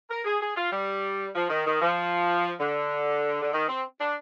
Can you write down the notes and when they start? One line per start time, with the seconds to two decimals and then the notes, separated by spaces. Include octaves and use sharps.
0.10 A#4
0.24 G#4
0.41 G#4
0.56 F4
0.71 G3
1.34 F3
1.50 D#3
1.65 D#3
1.81 F3
2.59 D3
3.42 D3
3.53 D#3
3.68 C4
4.00 D4